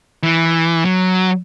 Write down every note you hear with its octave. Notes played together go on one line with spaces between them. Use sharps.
E3
F#3